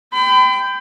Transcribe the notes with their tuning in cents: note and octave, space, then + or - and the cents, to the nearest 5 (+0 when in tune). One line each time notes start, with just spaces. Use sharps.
G5 +0 B5 +40